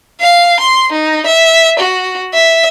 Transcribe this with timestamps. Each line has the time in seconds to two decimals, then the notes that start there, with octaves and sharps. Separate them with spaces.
0.21 F5
0.60 C6
0.92 D#4
1.26 E5
1.79 F#4
2.33 E5